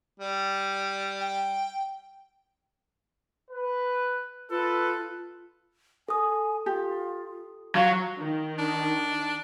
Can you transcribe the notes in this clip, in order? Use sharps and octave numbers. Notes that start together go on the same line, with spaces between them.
G3
G5
B4
F4 A4 B4
A4 G#5 D#6
F4 G4
F#3 F4 F5
D#3
D4